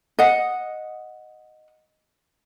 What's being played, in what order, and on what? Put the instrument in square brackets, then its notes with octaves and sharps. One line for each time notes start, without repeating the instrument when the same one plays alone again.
[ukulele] D#5 F#5